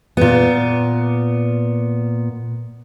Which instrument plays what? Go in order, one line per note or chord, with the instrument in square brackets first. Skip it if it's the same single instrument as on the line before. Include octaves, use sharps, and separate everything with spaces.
[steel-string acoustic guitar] A#2 B3